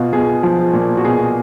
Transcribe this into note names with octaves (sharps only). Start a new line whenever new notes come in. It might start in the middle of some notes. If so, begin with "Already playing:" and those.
Already playing: B2 F4
B2 G#4
F3
A#2
F#4
B2 G#4